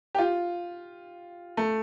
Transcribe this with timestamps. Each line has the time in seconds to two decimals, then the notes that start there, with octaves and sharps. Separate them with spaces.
0.15 G4
0.18 F4
1.57 A3